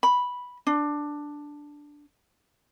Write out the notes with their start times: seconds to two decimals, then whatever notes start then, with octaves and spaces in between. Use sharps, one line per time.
0.03 B5
0.67 D4